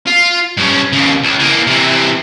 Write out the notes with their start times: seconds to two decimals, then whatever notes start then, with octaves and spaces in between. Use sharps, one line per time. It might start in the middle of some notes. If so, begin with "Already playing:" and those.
0.07 F4
0.57 G2 C#4
0.93 D#2 C#3
1.24 C#2
1.40 E3 A#3
1.67 C3 E3